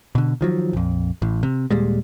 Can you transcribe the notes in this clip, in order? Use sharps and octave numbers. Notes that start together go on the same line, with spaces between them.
B2 D3
D#3 F3 F#3
A#1 F2
A1 A2
C3
D#2 A#2 G3 G#3